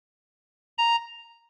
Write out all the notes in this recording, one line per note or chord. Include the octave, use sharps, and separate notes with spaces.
A#5